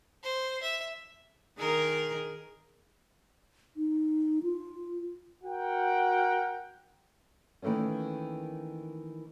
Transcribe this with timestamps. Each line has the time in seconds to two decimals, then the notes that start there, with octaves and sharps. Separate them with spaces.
0.23 C5
0.63 E5
1.58 D#3 G#4 A#4
3.76 D#4
4.43 F4
5.43 F#4 A#4 F#5 G5
7.62 D#3 E3 A3 A#3 C#4